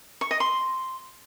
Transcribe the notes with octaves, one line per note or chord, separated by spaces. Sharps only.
C#6
D#5
C6